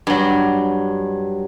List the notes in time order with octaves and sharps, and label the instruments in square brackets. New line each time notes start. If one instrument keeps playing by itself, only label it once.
[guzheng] G2 F#3